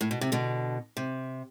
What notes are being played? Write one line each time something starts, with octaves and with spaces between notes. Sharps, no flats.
A2
B2
C3
B2 D3
C3